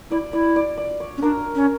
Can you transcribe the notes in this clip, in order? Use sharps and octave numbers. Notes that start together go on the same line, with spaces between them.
E4 D5
E4 D5
D5
D5
C#5
C#4
D4 A#4
C#4